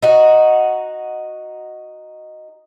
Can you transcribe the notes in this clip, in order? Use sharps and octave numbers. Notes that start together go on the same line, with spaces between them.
D#4 F#4